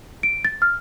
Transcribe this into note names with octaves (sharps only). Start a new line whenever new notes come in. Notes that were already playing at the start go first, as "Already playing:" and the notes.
D7
A6
F6